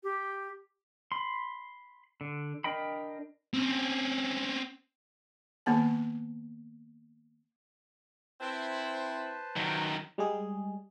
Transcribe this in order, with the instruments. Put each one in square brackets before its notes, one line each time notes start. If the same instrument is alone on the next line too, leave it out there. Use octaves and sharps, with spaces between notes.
[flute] G4
[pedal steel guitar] B5 C6
D3
D4 A#4 D#5 G5 B5
[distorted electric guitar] C4 C#4
[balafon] D#3 A#3 B3 A5
[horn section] C4 E4 [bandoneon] B4 C5 A5
[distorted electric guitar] D#3 F#3
[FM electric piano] G3 G#3 G#4